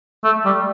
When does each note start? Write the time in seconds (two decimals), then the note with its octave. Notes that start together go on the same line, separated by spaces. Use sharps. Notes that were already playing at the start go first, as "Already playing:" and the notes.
0.24 A3
0.45 G3